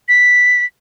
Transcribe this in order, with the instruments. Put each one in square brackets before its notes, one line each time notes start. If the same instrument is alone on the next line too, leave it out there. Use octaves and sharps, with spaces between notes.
[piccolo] B6